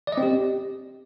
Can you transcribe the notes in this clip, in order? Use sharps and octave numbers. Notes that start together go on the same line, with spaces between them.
D5
D#5
C4
G4